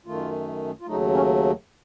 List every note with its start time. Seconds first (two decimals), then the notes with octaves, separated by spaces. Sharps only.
0.06 F#2 D#3 A3 F4
0.81 F4
0.87 D#2 C#3 F#3 A3 D#4
1.14 C#4